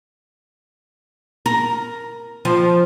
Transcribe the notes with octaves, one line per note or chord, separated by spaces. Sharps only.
A#4
F3